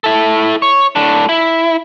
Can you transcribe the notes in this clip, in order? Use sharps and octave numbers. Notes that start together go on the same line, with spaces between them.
E4 A4
C#5
A2 D4
E4